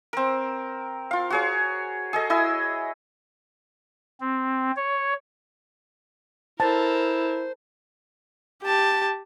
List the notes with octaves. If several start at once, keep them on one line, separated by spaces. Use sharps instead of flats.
C4 A#4
F4 F5
F#4 G#4 C#5
G#4 A4 D#5
E4 D#5 G#5 E6
C4
C#5
E4 A4 A#4 C5 A5
G4 A5